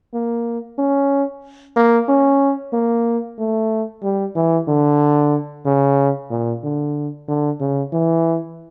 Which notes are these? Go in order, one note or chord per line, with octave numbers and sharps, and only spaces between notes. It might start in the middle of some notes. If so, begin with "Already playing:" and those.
A#3
C#4
A#3
C#4
A#3
A3
G3
E3
D3
C#3
A#2
D3
D3
C#3
E3